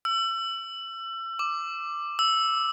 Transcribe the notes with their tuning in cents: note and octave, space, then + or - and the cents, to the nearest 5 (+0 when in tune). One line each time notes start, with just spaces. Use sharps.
E6 +30
D6 +10
E6 +0